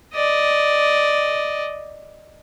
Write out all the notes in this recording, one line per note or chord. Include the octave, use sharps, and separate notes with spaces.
D5 D#5